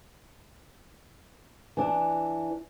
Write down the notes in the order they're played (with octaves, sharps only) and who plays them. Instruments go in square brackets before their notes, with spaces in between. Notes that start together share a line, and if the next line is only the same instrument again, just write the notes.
[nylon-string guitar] E3 D4